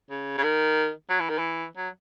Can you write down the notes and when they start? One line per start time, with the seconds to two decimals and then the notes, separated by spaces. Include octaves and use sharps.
0.10 C#3
0.37 C#3
0.43 D#3
1.10 F#3
1.20 E3
1.29 D#3
1.38 E3
1.77 F#3